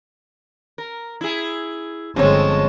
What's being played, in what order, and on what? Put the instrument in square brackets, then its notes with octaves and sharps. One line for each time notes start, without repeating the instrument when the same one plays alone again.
[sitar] A#4
E4 G#4
[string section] G1 G#3 A5 [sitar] F3 C4 C#4 [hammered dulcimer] C#5 C6